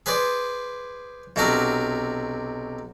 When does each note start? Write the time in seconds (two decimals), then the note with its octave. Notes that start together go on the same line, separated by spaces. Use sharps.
0.06 G#4 B4 C5 D5
1.36 B1 C3 D4 F#4 A#4 E5